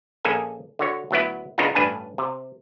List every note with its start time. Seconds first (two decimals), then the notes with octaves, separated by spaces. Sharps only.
0.25 A#1 A#3 C#4 G#4 A4 G#5
0.79 D3 F#4 C#5
1.11 D2 F#3 B3 E4
1.58 C#3 B3 D4 D#4 F4
1.75 A1 G2 D4 B4 G#5 A5
2.18 C3